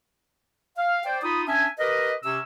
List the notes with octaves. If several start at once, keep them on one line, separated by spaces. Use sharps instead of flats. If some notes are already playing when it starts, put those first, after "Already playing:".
F5
C5 D5 G5
D#4 F4 B5 D#6
C#4 D4 E5 G#5
G4 A#4 B4 D#5
C3 C#4 E6